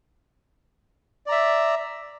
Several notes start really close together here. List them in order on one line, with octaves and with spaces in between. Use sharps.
D5 A#5 E5